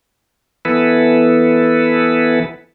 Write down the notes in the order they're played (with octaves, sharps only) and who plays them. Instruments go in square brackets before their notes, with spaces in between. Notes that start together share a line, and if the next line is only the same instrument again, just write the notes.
[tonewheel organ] E3 B3 E4 A4 B4